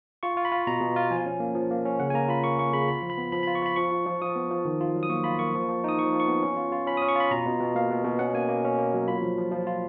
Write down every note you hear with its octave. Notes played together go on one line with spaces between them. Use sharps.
F4 C#6
F4
B5
F4
B2 A#5
B2
F4
F3 G#5
C#4
A#3
F3
A#3
C#4
C#3 F#5
G#5
A#3 A#5
F4 B5
A#3 C#6
A#3 C#6
C#3 B5
F4 B5
F3
B5
B3
F3 B5
B5
F4
C#6
F4 B5
F3 C#6
F4
F3
F3 D#6
B3
F3
D#3
F4
F#3
D#6
A#3 C#6
F4 B5
A#3 C#6
F3
F3
D#4 D#6
F3 C#6
F3
C#6
B3
C#4
F4
F4
C#4 B5
D#6
C#4
C#6
F4 B5
B2 A#5
B2
B2
A#3 F5
B2
B2
C#4 F#5
A#3 G#5
A#3
C#4
A#3
F#3
F4 B5
F3
F3
F3
F4